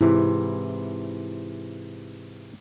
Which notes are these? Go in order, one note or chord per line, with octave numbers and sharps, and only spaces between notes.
G#2 C3 E3 E4